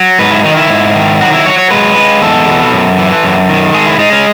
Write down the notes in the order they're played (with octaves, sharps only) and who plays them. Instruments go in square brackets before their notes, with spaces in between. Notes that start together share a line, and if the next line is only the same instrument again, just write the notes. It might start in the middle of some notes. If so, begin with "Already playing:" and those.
Already playing: [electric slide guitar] F#3
G#2 B4
E4
D#3 D#4
E4
G#2
D#3
F#3 F#4
E4
F#3 C#5
C#5
G#3 B4
G#3
E2 A4
B2
F#2
E3
F#2
D#3
G#3 G#4
E4
G#3 D#4
C#4